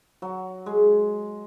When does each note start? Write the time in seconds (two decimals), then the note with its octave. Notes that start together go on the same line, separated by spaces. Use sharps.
0.22 F#3
0.66 G#3